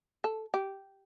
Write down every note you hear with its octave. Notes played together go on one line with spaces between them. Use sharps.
A4
G4